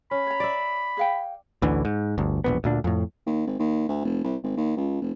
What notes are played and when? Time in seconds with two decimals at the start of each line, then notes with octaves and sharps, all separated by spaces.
0.11 C#4 B5
0.27 C#5 A#5
0.40 D5 E5
0.97 G#4 F5 G5
1.62 A1 D2 D3 E3
1.85 G#2
2.18 G1 D2
2.44 E1 A#1 B3
2.64 D2 A#2 D4
2.84 F2 A2
3.26 D#2
3.47 G#1
3.59 D#2
3.89 D2
4.04 F1
4.24 C2
4.43 G#1
4.57 D#2
4.77 C#2
5.01 F1